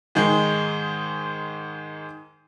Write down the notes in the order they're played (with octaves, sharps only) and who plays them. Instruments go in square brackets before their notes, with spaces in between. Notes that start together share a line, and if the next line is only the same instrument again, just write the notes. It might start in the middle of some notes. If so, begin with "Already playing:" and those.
[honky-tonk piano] G#2 D#3 G#3